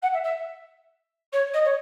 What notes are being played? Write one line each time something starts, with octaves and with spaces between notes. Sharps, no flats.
F#5
E5
E5
C#5
D#5
C#5